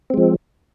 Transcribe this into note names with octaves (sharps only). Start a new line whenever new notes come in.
F3 G#3 C4